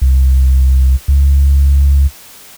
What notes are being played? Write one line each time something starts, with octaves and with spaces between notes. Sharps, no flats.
C2
C#2